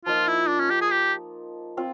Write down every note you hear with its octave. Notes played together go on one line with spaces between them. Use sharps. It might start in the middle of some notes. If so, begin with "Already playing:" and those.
F3 A#3 D#4 F4
E4
D4
C#4
G4
G#4
G4
C4 F4